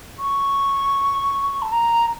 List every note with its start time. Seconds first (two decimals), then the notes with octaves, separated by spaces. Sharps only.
0.19 C#6
1.62 A5
1.72 A#5